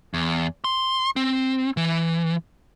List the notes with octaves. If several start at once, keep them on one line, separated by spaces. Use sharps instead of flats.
E2
C6
C4
E3